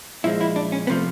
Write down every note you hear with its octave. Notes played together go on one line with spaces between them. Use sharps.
A#2 F3 G#3 E4
E4
D4
C#4
C3 F3 A3 B3